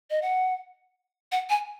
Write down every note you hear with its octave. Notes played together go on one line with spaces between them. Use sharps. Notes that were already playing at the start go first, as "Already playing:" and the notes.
D#5
F#5
F#5
G#5